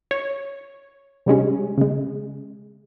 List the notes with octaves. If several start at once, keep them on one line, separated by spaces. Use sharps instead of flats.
C#5
C3 G3 G#3 C#4
C#3 G#3